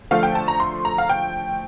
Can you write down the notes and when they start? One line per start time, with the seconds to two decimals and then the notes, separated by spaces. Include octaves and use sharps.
0.11 D3 F3 A3 F5
0.23 G5
0.35 A5
0.48 A#5
0.60 C6
0.85 A#5
0.98 F5
1.10 G5